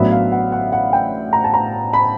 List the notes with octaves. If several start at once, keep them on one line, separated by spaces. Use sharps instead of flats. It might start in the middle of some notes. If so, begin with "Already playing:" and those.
Already playing: A1 A2 F#3 B3 D4 E5
F5
F#5
F#5
F#5
G5
A#5
A5
A#5
B5